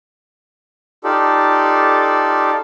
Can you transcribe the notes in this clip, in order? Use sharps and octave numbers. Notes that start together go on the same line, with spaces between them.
D#4 F4 G4 A4 D5